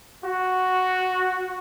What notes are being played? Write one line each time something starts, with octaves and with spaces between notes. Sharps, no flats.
F#4